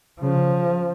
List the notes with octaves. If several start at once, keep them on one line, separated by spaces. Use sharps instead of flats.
C#3 F3